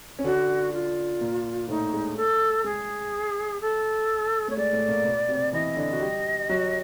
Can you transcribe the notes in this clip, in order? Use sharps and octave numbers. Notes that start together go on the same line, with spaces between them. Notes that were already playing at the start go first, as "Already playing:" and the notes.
C#4
D3 D4 F#4
F4
A#2 A#3
A2 A3 D#4
G#3
A4
G#3 G#4
A4
A3 C#5
G#3 D5
A2 A3
A#2 A#3
B2 B3
C3 C4
E3 E4 D#5
D3 D4
F#4
G3 G4
F#3 F#4